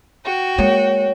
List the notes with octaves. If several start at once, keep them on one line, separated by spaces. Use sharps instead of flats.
F#4 G5
G#3 A#3 C#5